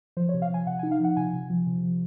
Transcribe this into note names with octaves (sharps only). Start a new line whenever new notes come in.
F3 C5
C#5
C3
F5
F3 G#5
C3 F#5
G#5
D#4
F5
F3 F#5
C3 G#5
C3
F3
C3
F3